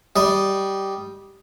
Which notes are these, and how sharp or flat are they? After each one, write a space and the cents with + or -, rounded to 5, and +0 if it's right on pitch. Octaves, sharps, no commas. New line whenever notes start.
G3 -10 D#5 -5